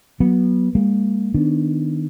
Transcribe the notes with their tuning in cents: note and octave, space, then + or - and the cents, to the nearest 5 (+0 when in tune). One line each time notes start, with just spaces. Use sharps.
F#3 +0 B3 -25
G3 +45 A#3 -10
D#3 +0 B3 +5 D4 +0